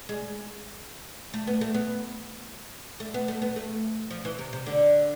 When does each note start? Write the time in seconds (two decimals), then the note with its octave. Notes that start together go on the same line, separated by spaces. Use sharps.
0.09 G#3
1.34 A3
1.47 B3
1.61 A3
1.74 B3
3.00 A3
3.14 B3
3.28 A3
3.42 B3
3.56 A3
4.11 F3
4.25 E3
4.39 C3
4.53 C3
4.66 D3